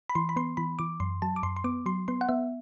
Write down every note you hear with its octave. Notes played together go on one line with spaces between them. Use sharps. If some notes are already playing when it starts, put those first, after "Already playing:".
B5
E3 C6
B5
B3 C6
E3 B5
E3 D6
F#2 C6
F#3 A5
D6
F#2 C6
C6
B3 D6
F#3 C6
B3 C6
F#5
B3 E5